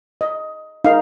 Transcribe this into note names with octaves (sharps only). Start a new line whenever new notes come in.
D#5
D#4 A#4 F5